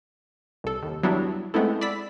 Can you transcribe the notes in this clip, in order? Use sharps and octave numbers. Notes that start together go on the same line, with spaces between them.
C2 A4
D#2
F#3 G3 B3 D4 E4 F#4
G#3 A3 B3 C4 E4 A4
D5 B5 E6 B6